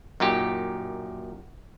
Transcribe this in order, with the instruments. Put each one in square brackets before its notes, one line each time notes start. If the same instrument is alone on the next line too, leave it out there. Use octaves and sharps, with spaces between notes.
[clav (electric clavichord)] F#2 A#2 D#4 G4